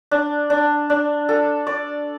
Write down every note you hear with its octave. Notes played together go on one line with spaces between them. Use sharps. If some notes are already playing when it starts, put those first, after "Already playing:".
D4
D4
D4
A4
D5